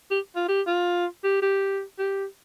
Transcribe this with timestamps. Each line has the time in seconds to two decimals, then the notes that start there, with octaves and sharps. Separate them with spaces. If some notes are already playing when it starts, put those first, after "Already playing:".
0.11 G4
0.36 F4
0.48 G4
0.67 F4
1.24 G4
1.42 G4
1.99 G4